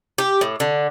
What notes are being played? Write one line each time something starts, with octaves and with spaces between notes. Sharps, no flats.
G4
A2
D3